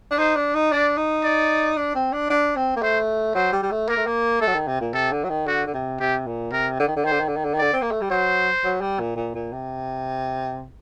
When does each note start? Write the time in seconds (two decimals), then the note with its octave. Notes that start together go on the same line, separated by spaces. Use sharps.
0.11 D4
0.18 D#4 C5
0.35 D4
0.54 D#4
0.71 D4 D5
0.97 D#4
1.24 D5
1.77 D4
1.95 C4
2.13 D4
2.30 D4
2.56 C4
2.76 A#3
2.82 A3 C5
3.35 F#3 C5
3.52 G3
3.63 G3
3.71 A3
3.88 A#3 A#4
3.97 A3
4.06 A#3
4.41 A3 A4
4.47 F#3
4.54 D#3
4.67 C3
4.81 A#2
4.93 C3 A4
5.12 D3
5.24 F#3
5.29 D#3
5.46 D3 F#4
5.66 D3
5.74 C3
6.00 C3 G4
6.27 A#2
6.52 C3 A#4
6.80 D3
6.87 D#3
6.96 D3
7.04 D#3 C5
7.12 D3
7.20 D#3
7.28 D3
7.36 D#3
7.45 D3
7.54 D#3
7.58 D3 D5
7.73 C4
7.82 A#3
7.92 A3
8.01 G3
8.10 F#3 C5
8.64 F#3
8.81 G3
8.99 A#2
9.16 A#2
9.35 A#2
9.52 C3